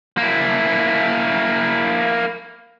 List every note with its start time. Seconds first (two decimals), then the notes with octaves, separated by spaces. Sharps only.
0.18 A#3 E4